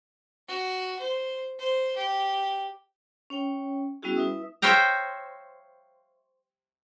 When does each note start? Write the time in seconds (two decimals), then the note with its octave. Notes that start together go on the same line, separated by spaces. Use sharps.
0.48 F#4
0.99 C5
1.59 C5
1.96 G4
3.30 C#4 C#5 G5
4.03 G3 B3 C#4 E4 F#4 G#4
4.15 E4 B4 E5 D#6 E6
4.62 C5 C#5 E5 F5 G5 A#5